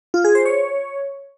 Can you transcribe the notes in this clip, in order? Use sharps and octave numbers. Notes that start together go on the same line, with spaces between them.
F4
G#4
C5
C#5